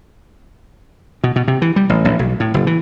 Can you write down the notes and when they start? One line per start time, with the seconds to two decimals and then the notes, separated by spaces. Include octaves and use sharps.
1.24 B2
1.36 B2
1.48 C3
1.62 E3
1.76 G3
1.89 A1
2.05 A1
2.19 B1
2.40 A2
2.54 F#1
2.67 E3